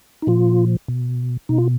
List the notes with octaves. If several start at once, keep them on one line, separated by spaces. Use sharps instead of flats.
D#4
A#2 F3 F4
B2
B2 D#4
F4